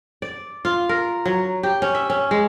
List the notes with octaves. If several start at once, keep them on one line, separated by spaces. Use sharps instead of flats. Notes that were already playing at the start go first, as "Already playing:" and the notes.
D5
F4
A#4
F#3
G4
C#4
E5
C#4
G#3